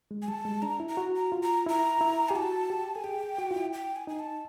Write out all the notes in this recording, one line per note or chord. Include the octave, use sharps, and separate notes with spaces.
G#3
G#5
G3 A5
G#3
D4 A#5
E4
A#5
F#4
A#5
F4
A#5
E4 A#5
E4
G4 G#5
F#4 A5
G4
A4 G#5
G#4 G5
F#4
F4
E4
G5
G#5
D#4 G#5
A5